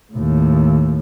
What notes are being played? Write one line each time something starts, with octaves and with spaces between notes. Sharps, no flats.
D#2 A2